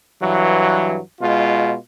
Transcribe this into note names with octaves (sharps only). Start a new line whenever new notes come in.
G2 E3 F#3
B2 G#3 F4